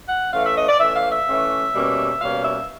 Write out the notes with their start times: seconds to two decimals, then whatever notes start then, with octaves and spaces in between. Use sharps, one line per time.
0.09 F#5
0.33 E3 A3 C#4 F5
0.44 E5
0.56 D#5
0.68 D5
0.80 E3 A3 C#4 E5
0.95 F5
1.11 E5
1.27 E3 A3 C#4
1.74 B2 G3 A#3 C#4
2.20 B2 G3 A#3 C#4 F5
2.44 E5